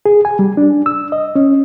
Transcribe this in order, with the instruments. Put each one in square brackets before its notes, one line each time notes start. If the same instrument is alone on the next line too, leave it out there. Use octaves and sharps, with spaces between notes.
[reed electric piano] G#4
G#5
G3
D4
E6
D#5
C#4